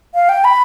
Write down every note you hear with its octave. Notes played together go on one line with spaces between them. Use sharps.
F5
G5
B5